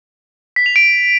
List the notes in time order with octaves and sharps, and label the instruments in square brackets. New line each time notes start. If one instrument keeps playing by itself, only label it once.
[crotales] B6
F7
D7